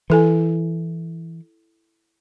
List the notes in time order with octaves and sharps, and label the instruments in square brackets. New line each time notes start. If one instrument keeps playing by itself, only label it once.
[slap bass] E3 [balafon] E4 A4 G#5